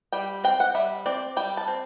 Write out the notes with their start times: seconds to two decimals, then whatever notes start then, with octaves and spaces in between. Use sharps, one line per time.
0.13 G3 G5
0.44 C4 G5
0.60 F#5
0.75 G3 E5
1.06 C4 D5
1.37 G3 G5
1.57 A5
1.68 C4